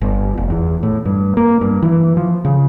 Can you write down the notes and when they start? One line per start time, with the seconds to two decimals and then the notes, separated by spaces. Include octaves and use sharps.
0.01 G1
0.38 F1
0.50 E2
0.83 A2
1.05 G2
1.37 A#3
1.61 G2
1.82 E3
2.17 F3
2.45 C#3